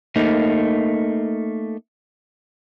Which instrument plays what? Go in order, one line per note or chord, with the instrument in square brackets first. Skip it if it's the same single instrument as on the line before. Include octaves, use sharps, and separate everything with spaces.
[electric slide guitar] A3 A#3 D#4